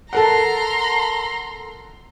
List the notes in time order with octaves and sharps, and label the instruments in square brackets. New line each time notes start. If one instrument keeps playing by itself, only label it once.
[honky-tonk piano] A4 A#4 F#5 [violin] A#5 C6